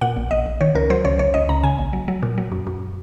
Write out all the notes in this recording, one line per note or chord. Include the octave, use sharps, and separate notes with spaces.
A#2 F#5
A#1
A#1 D#5
A#1
D#3 C#5
C#2 A#4
F#3 C5
C#2 C#5
C#2 C#5
C#2 D#5
C#2 A#5
C#3 G#5
A#1
F#3
F#3
A#2
F#3
F#2
F#2